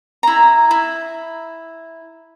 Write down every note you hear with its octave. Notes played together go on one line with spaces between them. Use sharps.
E4 A#5
E4